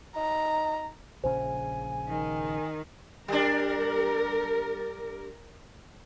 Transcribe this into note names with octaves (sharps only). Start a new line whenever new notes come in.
D#4 A#5
A#1 C#3 C5 G#5
D#3
G3 D4 A#4